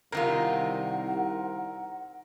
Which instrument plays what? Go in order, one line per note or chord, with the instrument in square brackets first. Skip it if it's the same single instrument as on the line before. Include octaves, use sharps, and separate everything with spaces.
[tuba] C2 [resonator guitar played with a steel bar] C3 D#3 F4 [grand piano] A#4 [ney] F#5